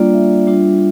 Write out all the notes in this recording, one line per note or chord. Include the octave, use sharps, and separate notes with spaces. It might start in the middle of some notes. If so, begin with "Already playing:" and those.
Already playing: G3 A#3 D4 F4 D5
E5
G3 D4 F4